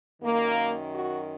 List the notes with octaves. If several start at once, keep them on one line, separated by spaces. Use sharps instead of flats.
F#2 D#3 A#3
F#4